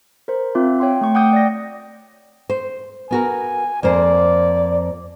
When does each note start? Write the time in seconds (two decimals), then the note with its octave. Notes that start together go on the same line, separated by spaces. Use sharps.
0.28 A#4 C5
0.55 C4 F4 E5
0.80 C#5 G5 C6
1.01 A3 C#6
1.15 F#5 G5 D6 D#6 G6
1.33 D5 G6 A#6
2.50 C5
3.11 B3 F#4 A#4 G#5
3.83 F2 A#3 C5 D5